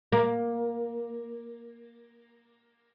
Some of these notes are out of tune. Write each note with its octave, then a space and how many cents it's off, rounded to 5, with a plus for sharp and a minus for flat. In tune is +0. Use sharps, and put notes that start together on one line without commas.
A#3 +10